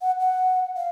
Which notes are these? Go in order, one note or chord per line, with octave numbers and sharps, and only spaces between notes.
F#5
F#5
F5